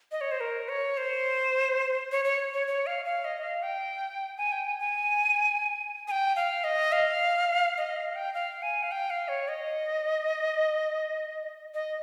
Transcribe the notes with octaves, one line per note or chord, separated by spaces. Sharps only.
D#5
C#5
C5
A#4
C#5
C5
C#5
C#5
C#5
C#5
F5
F5
D#5
F5
G5
G#5
G5
G#5
G#5
G#5
G5
F5
D#5
F5
D#5
F5
G5
F5
G#5
F5
G5
F5
C#5
D#5
D#5